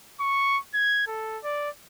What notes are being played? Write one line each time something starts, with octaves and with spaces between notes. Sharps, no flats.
C#6
G#6
A4
D5